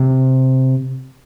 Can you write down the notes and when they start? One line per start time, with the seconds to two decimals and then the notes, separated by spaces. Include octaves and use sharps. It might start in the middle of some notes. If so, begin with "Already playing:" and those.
Already playing: C3